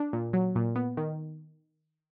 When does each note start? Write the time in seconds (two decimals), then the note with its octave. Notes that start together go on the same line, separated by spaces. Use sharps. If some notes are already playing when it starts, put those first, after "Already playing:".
Already playing: D4
0.13 A#2
0.33 F#3
0.55 A#2
0.76 B3
0.97 D#3